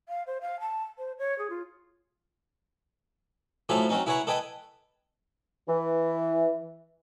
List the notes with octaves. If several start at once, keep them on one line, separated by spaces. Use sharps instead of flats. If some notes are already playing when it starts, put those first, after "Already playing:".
F5
C5
F5
A5
C5
C#5
G#4
F4
A2 F3 F#3 A4 G#5 B5
F#3 C4 C#4 D#4
E4 G#4 B4 C#5 F#5 A#5
A4 B4 D#5 G5 G#5
E3